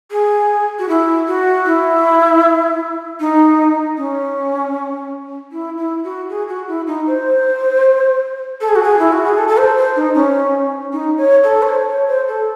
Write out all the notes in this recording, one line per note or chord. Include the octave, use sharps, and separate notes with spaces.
G#4
F#4
E4
F#4
E4
D#4
C#4
E4
E4
F#4
G#4
F#4
E4
D#4
C5
A4
G#4
F#4
G#4
E4
F#4
G#4
A4
A4
C5
C5
D#4
C#4
D#4
C#5
A4
C#5
C5
C#5
C5
A4